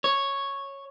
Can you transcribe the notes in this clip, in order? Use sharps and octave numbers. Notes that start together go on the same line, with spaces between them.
C#5